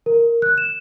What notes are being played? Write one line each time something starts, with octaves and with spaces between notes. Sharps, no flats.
A#4
F#6
E7